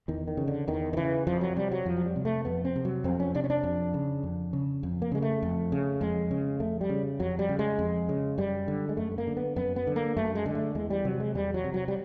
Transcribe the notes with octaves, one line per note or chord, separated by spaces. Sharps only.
E2 D#3
D#3
C#3
D3
E2 D#3
D#3
C#3 E3
F2 F3
F#3
C3 G3
F#3
F2 F3
F#3
G3
C3
A3
F2 B3
C4
C3
F#3
F2 C4
C#4
C3 D4
C#4
D4
F2
C#3
F2
C#3
F2
A#3
C#3 G#3
A3
F2
C#3
F2 G#3
C#3
F2 A3
G3
C#3
F2 F#3
G3
C#3
G#3
F2
C#3
F#2 G3
D3
G#3
F#2 A3
A3
A#3
D3
B3
F#2 B3
B3
D3
A#3
F#2 A3
G#3
D3 G#3
A3
E2 G#3
G3
C3 F#3
G3
G#3
E2 G3
F#3
C3
F#3
G3